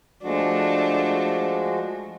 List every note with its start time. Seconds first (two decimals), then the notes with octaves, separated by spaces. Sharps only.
0.23 F3 G#3 A3 D4 F#4